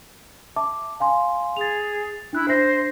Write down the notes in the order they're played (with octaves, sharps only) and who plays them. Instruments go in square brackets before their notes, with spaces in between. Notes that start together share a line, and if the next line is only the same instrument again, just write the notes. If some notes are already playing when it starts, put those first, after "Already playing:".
[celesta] E5 A5 D6
F5 G#5 C6
[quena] G#4 [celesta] A6 F7
[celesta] D4 F#6 [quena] E4
[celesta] D4 E5 A#6 [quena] C5